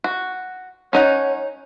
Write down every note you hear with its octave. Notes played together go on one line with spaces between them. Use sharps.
F#4
C#4 D#4 C#5 F#5